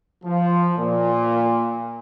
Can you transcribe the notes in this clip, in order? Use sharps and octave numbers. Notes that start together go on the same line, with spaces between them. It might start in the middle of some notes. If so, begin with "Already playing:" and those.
F3
A#2